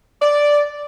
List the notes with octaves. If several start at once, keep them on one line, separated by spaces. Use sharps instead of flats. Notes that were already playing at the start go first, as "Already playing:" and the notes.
D5